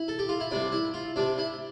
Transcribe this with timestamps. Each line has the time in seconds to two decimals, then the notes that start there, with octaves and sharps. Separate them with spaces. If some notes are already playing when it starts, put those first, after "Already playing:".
Already playing: E4
0.08 A4
0.19 G4
0.29 F4
0.40 E4
0.51 C3 G3 C4 D4
0.72 E4
0.94 F4
1.16 C3 G3 C4 D4
1.38 E4